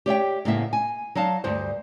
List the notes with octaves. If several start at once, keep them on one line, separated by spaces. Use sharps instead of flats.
G4 C#5 E5 G5
A2 C#3 A#3 B3 E5
G#5
F#3 D#4 F5 A5
D2 G2 C5